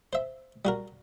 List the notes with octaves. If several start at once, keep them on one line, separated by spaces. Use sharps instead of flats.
C5 E5
G3 F#4 A#4